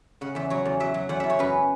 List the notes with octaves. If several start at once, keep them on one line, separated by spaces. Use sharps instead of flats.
C#3 F#5
E2 E5
F#3 C#5
E2
F#3 E5
F#3
E2 F#5
E2 E5
C#5
F#2 B4